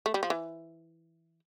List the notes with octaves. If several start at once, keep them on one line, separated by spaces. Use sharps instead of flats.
A3
G3
F3
E3